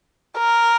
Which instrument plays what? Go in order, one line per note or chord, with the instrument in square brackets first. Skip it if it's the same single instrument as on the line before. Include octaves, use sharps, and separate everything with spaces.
[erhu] A#4